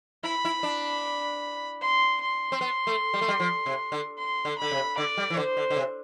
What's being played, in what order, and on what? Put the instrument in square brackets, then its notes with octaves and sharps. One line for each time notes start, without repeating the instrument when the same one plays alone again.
[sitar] E4 [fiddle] B5
[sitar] E4
D4
[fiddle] C6
C6
[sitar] C4
B3
A3
G3
A3
G3
F3
C3
D3
[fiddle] C6
[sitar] D3
[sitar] D3 [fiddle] B5
[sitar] C3
[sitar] D3 [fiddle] D5
[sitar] G3
E3
[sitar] D3 [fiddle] C5
[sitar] D3
D3
C3